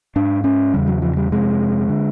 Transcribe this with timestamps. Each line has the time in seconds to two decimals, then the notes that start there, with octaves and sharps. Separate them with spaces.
0.16 G#2 D4
0.44 C#4
0.73 E2 C#3 G3
0.87 F#3
1.02 F3
1.17 G3
1.31 F2 C3 G#3
1.89 D3